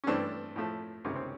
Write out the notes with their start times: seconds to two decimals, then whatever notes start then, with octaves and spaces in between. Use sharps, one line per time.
0.04 C#4
0.07 G2 E3 A3 C4 D4
0.56 A2 F3 A3
1.04 C#2 C3 D#3 C#4
1.16 C4